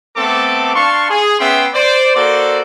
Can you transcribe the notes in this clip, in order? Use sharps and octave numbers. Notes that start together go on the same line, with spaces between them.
A3 B3 C4 A4 A5 D6
D4 F5 A5 C6 C#6
G#4
B3 C#4 E5 G5 C6
C5 D5
A#3 F#4 A4 C5 D5